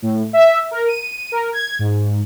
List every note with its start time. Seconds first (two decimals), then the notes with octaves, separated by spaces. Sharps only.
0.02 A2
0.33 E5
0.71 A#4
0.88 D#7
1.32 A#4
1.53 G#6
1.79 G#2